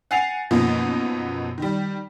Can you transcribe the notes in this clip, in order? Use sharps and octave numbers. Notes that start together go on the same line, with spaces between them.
F#5 G#5 A6 C7 F7
F#2 B2 F3 A#3 D#4
D#3 G3